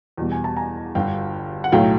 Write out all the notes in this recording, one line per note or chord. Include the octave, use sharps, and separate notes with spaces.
E2 B2 G3
G#5
A5
G#5 A#5
G1 G2 D3 F5 G5
F#5
B1 A2 F#3 A3 F5 G5